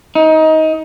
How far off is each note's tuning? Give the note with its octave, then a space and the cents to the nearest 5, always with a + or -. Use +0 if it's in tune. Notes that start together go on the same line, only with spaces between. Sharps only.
D#4 +20